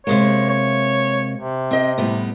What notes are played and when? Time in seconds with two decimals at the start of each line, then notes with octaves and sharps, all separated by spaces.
0.07 C3 G#3 A#3 C#5
0.50 C#5
1.39 C3
1.71 C4 D#5 G5
1.98 A2 G3 B3